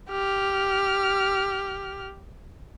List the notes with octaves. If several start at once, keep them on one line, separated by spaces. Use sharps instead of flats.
G4 F6